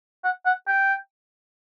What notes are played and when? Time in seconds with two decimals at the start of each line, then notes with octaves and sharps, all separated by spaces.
0.24 F#5
0.46 F#5
0.68 G5